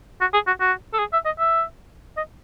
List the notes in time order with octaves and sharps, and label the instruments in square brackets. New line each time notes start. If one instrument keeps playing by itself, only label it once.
[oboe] F#4
G#4
F#4
F#4
A4
G#4
E5
D#5
E5
D#5